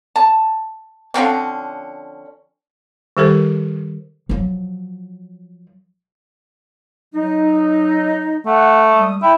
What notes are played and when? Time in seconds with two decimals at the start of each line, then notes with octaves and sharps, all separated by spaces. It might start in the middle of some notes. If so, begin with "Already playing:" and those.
0.16 A5
1.14 D3 F3 C4 C#4
3.17 D#3 G3 G4 A4 A#4 C5
4.29 F3 F#3
7.14 F#3 D#4
8.46 A3 F#5
8.93 G3 G#3 D#6
9.22 E4 G5